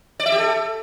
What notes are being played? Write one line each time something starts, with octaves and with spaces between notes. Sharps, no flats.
D5
E5
G4
A4